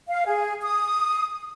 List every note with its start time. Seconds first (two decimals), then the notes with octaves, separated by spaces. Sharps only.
0.08 F5
0.25 G#4
0.62 D#6